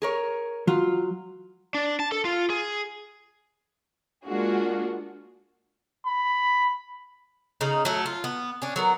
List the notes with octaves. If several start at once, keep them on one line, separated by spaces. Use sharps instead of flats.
G#4 A#4 C#5
F#3 F4
D4
A5
A4
F4
G#4
G#3 A#3 D4 F4 F#4 G#4
B5
C#3 D#4
F#3 A3
F4
B3
C#4 D4
F#3 B3 A#4